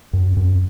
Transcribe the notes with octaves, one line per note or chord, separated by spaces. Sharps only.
F#2
F#2